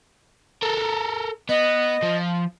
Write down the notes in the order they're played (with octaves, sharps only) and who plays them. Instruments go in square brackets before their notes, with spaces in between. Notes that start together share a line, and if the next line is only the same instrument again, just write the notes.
[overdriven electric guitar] A4 A#4
[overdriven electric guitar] B3 [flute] D#5
[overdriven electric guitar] F3